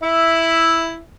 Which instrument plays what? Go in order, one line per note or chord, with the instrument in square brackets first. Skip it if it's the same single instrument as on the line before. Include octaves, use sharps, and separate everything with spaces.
[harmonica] E4 E5